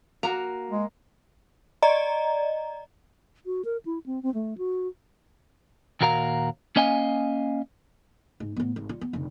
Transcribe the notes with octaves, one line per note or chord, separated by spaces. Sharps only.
A#3 F#4 A#5
G#3
D5 D#5 A#5
F#4
A#4
E4
C4
C4
A3
F#4
D#2 A#2 F#4 A#4 F5 A#5
A#3 C#4 D#5 F5 G#5
G#2 G#3
A2 B3
G#1
G3 F4
B3
F1 D3